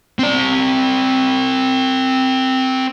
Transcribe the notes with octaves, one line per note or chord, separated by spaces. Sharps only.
C4 D5